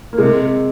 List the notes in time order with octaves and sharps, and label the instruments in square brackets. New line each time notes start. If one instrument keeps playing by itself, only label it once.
[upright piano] A#3
[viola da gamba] C3 [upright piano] G#3